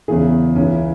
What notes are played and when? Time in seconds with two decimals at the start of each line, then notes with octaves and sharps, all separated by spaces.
0.08 E2 C#3 E3 G#4
0.55 C#2 C#3 E3 C#4